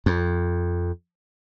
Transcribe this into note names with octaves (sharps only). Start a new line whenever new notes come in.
F2